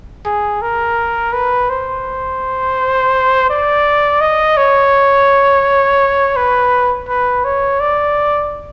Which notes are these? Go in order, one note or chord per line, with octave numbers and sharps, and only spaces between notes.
G#4
A#4
B4
C5
D5
D#5
C#5
B4
B4
C#5
D5